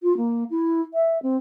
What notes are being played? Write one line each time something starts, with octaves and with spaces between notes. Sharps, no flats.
F4
A#3
E4
E5
C4